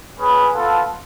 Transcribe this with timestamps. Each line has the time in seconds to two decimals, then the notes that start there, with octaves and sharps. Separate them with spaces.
0.19 C#4 G#4 B4
0.54 B3 F4 A4